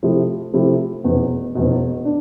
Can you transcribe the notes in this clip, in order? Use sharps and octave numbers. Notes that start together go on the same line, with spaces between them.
C3 F3 A3 E4 G4
C3 F3 A3 E4 G4
F1 E2 B2
F1 E2 B2
D4